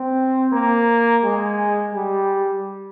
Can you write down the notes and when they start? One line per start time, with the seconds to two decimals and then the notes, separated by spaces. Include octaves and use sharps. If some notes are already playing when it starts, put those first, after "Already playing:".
Already playing: C4
0.53 A#3
1.24 G#3
1.94 G3